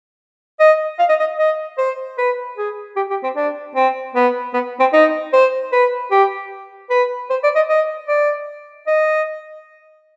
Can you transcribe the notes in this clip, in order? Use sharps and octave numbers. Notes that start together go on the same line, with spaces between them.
D#5
F5
D#5
D#5
D#5
C5
B4
G#4
G4
G4
C4
D4
C4
B3
B3
C4
D#4
C5
B4
G4
B4
C5
D5
D#5
D#5
D5
D#5